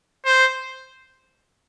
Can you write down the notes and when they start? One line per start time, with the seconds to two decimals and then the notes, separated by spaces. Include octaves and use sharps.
0.26 C5